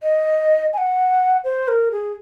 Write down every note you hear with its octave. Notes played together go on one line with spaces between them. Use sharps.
D#5
G#5
F#5
C5
A#4
G#4